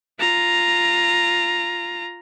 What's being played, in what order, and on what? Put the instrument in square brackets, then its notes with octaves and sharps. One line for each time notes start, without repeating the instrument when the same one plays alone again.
[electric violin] F4 A#5